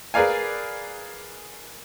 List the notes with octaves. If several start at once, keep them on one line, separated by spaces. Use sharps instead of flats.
G#4 A#4 B4 D5 F5 G#5